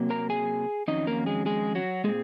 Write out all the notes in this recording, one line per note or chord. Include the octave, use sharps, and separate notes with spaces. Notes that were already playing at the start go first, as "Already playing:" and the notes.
Already playing: C3 F#3 A#3
A#4 A#5
G#4 G#5
F2 D#3 F#3 C#4 D#4 D#5
A#3 A#4
G#3 G#4
G#3 G#4
F#3 F#4
A#2 G#3 C4 G#4